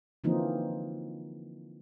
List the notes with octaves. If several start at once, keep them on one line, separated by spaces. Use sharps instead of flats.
D3 E3 F3 A#3 C4 D#4